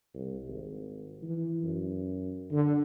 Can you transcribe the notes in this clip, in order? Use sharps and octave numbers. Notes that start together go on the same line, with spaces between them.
C2
G#1
E3
F#2
D3